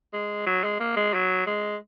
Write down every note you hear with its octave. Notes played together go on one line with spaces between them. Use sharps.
G#3
F#3
G#3
A#3
G#3
F#3
G#3